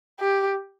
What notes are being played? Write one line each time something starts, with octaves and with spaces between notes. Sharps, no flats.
G4